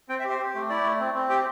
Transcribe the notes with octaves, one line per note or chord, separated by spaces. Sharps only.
C4 G5
E5
G4
C5
G4
A3
E4 D5
A3
C4
C4
G4 G5